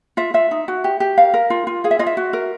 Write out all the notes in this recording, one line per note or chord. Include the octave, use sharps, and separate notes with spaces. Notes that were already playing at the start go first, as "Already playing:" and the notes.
F4 E5
F4 E5
D#4
F#4
G4
G4
A#4 F5
A#4
F4
F4
G#4 F5
E5
F4 D#5
E5
F#4
A#4